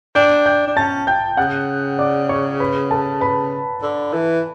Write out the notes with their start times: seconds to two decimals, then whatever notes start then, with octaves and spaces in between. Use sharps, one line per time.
0.15 D4 G5 G6
0.46 G5 G6
0.67 D4
0.76 C#4 A5 A6
1.07 G5 G6
1.37 C#3 F#5 F#6
1.99 D5 D6
2.29 C#5 C#6
2.60 B4 B5
2.91 A4 A5
3.21 B4 B5
3.82 D3
4.13 E3